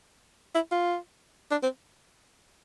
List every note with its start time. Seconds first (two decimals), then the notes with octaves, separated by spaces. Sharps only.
0.55 E4
0.71 F4
1.51 D4
1.63 C4